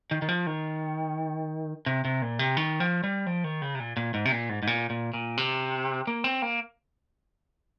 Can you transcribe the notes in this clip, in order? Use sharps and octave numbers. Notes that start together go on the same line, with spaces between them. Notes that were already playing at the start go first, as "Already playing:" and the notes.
D#3
D#3
F3
D#3
C3
C3
A#2
C3
D#3
F3
G3
F3
D#3
C#3
C3
A#2
A#2
G#2
C3
A#2
G#2
G#2
A#2
A#2
A#2
C3
A#3
C4
A#3